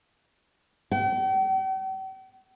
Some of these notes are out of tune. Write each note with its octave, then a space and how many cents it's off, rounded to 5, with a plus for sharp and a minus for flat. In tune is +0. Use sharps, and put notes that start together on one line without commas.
G5 -45